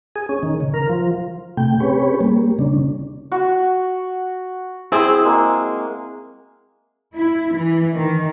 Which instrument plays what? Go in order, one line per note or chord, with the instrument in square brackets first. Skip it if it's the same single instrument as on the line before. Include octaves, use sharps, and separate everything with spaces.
[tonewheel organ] G#4
C#4
D#3
C#3
A#4
F3
C3 A3 G5
C4 C#4 G4 G#4 B4 C#5
G3 A#3
C#3 C#4 D4
[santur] F#4
[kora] C4 E4 G#4
[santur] G#3 A#3 G#5
[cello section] E4
E3
D#3